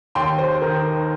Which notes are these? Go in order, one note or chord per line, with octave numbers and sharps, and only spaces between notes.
D#2 G5 C6
C5
D#3 A#4